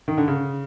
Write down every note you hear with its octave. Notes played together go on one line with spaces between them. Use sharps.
D#3
D3
C#3